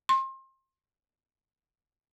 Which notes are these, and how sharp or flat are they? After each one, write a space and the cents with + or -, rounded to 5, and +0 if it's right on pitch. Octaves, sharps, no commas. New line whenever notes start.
C6 +30